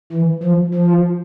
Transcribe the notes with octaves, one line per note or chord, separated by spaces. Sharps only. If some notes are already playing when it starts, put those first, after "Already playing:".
E3
F3
F3